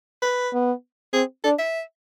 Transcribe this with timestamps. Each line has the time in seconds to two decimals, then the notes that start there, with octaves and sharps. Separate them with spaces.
0.22 B4
0.53 B3
1.13 C4 G#4
1.44 D4 A4
1.59 E5